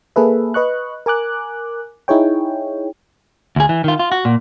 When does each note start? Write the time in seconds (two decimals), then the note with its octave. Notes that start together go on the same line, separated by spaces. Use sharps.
0.16 A#3 G#4 A4 B4 E5
0.54 B4 D#5 C#6 F#6
1.06 A#4 G#5 D6 F#6
2.08 D#4 E4 G#4 C#5 G5
3.56 D2 G#4
3.69 E3
3.84 D#3 F4
3.99 F4
4.12 F#4
4.25 A#2